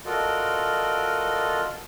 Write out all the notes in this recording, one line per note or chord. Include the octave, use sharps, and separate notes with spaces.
F4 F#4 A4 A#4 D5 D#5